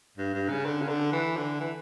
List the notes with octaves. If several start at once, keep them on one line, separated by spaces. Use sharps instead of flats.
G2
G2
C#3
D3
C#3
D3
E3
D3
E3